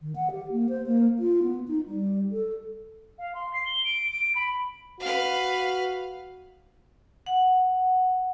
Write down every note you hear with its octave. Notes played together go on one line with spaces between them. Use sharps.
D#3
F#5
G4
A#3
C5
A#3
F4
B3
D#4
G3
A4
F5
C6
C7
G7
D7
D7
B5
F#4 B4 F5
F#5